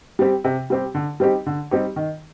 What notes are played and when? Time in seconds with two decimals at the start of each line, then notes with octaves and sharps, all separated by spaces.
0.19 G3 C4 G4
0.44 C3
0.70 G3 C4 G4
0.95 D3
1.20 G3 C4 D#4 G4
1.46 D3
1.71 G3 C4 D#4 G4
1.96 D#3